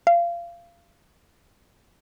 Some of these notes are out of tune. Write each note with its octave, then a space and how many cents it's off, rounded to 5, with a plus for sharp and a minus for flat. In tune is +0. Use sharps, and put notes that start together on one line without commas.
F5 -25